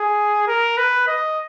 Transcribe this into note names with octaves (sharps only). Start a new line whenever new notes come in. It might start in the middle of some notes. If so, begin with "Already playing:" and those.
Already playing: G#4
A#4
B4
D#5